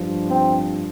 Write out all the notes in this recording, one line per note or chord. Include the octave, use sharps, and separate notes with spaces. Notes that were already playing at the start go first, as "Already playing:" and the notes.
Already playing: G2 F3
C4